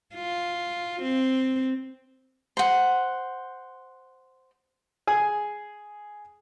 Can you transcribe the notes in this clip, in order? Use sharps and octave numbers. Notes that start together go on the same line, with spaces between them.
F4
C4
C5 F#5
G#4 G#5